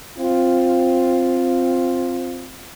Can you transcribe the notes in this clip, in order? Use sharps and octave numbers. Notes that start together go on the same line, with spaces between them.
C4 F4